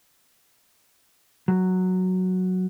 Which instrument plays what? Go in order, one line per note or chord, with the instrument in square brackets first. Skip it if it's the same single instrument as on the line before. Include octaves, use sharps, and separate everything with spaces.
[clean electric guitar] F#3